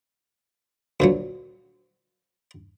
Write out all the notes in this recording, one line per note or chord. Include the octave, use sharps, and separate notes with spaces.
D2 A#2 F#3